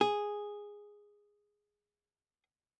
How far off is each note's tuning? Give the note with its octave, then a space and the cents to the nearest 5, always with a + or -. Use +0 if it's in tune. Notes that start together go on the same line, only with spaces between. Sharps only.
G#4 -5